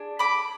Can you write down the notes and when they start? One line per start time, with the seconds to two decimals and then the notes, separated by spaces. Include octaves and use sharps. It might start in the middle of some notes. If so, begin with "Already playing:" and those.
Already playing: D4 G#4
0.19 B5 D6